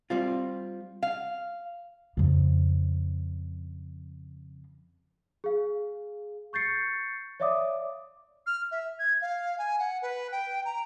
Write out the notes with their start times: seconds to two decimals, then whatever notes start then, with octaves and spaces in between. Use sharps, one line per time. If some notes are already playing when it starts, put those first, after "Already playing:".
0.10 G3 C4 F4
1.02 F5
2.17 F2 C#3
5.44 G#4 F5
6.53 C#6 G6 A6 C7 C#7
7.40 C#5 D5 E5 F5 D6 D#6
8.47 F6
8.71 E5
8.99 G#6
9.21 F5
9.58 G#5
9.79 F#5
10.02 B4
10.32 G5
10.65 A#5